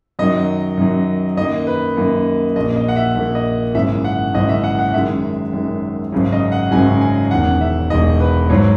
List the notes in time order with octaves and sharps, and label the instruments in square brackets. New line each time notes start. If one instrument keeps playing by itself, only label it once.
[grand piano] F#2 D#3 F#3 D#5
F#2 D#3 F#3
F#2 D#3 A#3 D#5
B4
F#2 D#3 A#3
A#1 A#2 A#3 D#5
D#5
F#5
E5
A#1 A#2 A#3 E5
D#5
G#1 F#2 C#3 E3 E5
F#5
G#1 F#2 C#3 E3 D#5
E5
F#5
F#5
F#2 D#3 G#3 E5
F#2 D#3 G#3
G#1 F#2 C#3 F#3
D#5
F#5
G#1 F#2 C#3 F#3 G#5
G#5
E1 E2 D#3 F#5
E5
E1 E2 D#3 D#5
B4
G#1 G#2 F#3 C#5